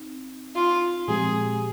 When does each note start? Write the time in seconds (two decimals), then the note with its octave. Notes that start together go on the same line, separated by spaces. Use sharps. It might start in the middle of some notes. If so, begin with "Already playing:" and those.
Already playing: C4 D#4
0.55 F4
1.08 A#2 F3 G#3 C4 G4 G#4